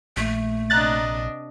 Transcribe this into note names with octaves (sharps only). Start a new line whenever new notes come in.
A#1 A3
C3 D4 D#5 A#5 F#6 A6